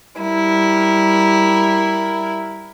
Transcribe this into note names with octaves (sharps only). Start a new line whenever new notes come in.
G3 E4 A#4